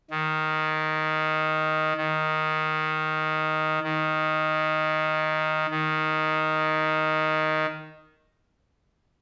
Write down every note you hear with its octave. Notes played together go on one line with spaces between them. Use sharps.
D#3
D#3
D#3
D#3